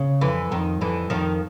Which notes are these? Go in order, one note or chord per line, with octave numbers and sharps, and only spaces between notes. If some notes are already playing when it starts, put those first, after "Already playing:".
Already playing: C#3
F2 D3 E3
F2 D#3
F2 D3 E3
F2 D#3 F3